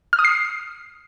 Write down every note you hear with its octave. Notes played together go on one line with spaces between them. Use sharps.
F6
D#6
C7